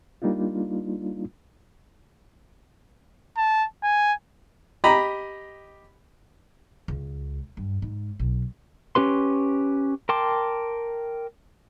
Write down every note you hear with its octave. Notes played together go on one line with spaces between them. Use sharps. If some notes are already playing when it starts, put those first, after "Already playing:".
G3 A#3 D4 D#4 F4
A5
G#5
G4 D#5 A#5 B5
C#2
G2
G#2
B1
C#4 G4 B4 C6
A#4 G5 A5 C6 D6